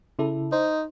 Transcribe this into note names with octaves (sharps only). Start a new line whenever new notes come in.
C#3 E4 A4
D#4 C5